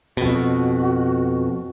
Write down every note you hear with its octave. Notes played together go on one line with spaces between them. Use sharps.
F2 B2 F#4